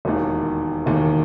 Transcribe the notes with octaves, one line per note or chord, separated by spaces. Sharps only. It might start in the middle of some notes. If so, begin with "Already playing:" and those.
E1 D#2 D#3
E1 D#2 D#3